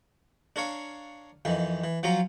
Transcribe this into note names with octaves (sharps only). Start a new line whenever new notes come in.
D4 A#4 C#5 F5
F2 D#3 E3
E3
F3 F#3 C#4 F4 A#5